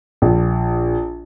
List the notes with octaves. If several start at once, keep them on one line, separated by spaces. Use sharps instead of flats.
A#1